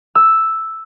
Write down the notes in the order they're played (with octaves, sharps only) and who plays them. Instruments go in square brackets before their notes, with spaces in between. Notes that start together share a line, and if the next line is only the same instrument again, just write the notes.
[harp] E6